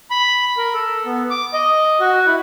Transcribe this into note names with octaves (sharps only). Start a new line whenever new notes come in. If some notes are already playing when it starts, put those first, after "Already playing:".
B5
A#4
A4
B3
D6
D#5
F#4
E4